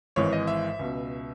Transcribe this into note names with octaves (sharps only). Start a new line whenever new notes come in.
G#1 G#2 E3 C#5
D#5
E5
C#2 B2